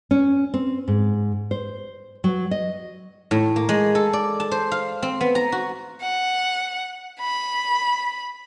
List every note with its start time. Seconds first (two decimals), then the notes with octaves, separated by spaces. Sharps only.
0.11 C#4
0.54 C4
0.88 G#2
1.51 C5
2.24 F#3
2.51 D#5
3.31 A2
3.56 A#3
3.69 G#3
3.95 A4
4.13 D5
4.40 A5
4.51 C5
4.72 F5
5.02 C4
5.21 B3
5.35 A#5
5.52 F#4
6.02 F#5
7.20 B5